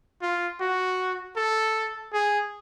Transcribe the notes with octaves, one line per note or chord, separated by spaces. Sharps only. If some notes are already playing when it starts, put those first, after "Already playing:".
F4
F#4
A4
G#4